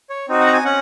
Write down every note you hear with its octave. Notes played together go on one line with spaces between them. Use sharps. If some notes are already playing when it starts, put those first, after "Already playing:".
C#5
C4 D#4 F#4
F#5
A#5
G#5
C#4 F#5